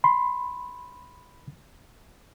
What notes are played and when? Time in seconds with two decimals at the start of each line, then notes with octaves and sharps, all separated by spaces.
0.04 B5 C6